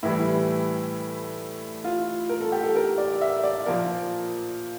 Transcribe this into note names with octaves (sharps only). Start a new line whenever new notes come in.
A2 E3 G3 E4
F4
A#4
A4
G4
A4
A#4
D5
E5
D5
A#2 F3 A#3 A#4